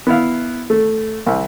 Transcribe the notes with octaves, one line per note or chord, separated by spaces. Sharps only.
B3 E4 F5
A3
C2